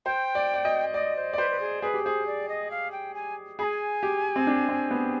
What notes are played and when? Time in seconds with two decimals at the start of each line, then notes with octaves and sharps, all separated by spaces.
0.06 C5 G5
0.35 D5
0.54 D5
0.65 D#5
0.94 D5 D#5
1.16 C5
1.33 D5
1.38 B4 C5
1.50 B4
1.60 G#4
1.82 G#4 B4
1.94 G4
2.04 G#4 C5
2.27 D5
2.49 D#5
2.71 F5
2.92 G5
3.15 G#5
3.59 G#4 B5
3.64 G#5
4.03 G4
4.36 C4
4.47 D4
4.69 C4
4.91 B3